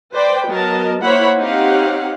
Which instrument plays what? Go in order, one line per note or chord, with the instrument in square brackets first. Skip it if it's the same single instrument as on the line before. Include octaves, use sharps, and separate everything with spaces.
[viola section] B4 C5 D5 G5
F#3 B3 A#4 D#5 A5
A#3 E4 C5 C#5 F#5 B5
C4 D#4 G4 C#5 F5 F#5